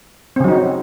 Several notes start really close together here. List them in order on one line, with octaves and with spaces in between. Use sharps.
C4 C#3 F#3 D#4 F#4